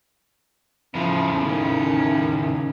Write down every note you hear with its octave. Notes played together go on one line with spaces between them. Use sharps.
A2 C#3 F3
D#3 C#4